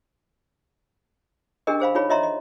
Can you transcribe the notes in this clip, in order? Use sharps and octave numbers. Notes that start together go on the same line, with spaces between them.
C#4 D4 G4 G#4 A#4 D#5
G#4 C5 F5 B5
D#4 F4 G#4 C#5 B5
F4 C#5 D#5 E5 A#5 C6
D#5